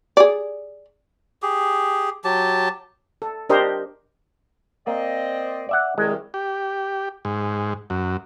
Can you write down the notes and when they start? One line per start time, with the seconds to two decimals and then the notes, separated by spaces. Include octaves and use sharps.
0.17 G#4 D5
1.42 G4 G#4
2.24 F#3 G4 A5
3.22 A4
3.49 D4 G4 A#4 C5 D#5
4.87 A#3 C4 D5 D#5
5.69 D5 E5 F#5
5.98 C2 D#3 G#3
6.34 G4
7.25 G#2
7.90 F#2